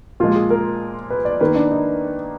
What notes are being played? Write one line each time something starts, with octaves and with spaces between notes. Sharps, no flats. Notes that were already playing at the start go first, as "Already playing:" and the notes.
A#2 F3 G#3 F4
G#4
A#4
B4
D5
D#3 A#3 B4
D4
D#4